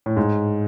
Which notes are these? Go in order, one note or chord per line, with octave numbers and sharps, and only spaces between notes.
A2
G#2